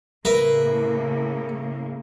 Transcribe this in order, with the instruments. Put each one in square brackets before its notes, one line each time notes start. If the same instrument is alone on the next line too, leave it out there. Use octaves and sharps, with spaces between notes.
[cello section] A2 C#3 A#3 [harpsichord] A#4 B4 E5